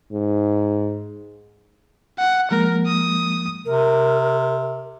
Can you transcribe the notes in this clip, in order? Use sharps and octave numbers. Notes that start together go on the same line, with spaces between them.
G#2
F#5
F3 G#3 A#3 A#4
D#6
C3 A#4